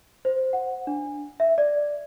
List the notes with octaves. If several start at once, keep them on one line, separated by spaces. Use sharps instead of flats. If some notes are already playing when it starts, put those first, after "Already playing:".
C5
F#5
D4
E5
D5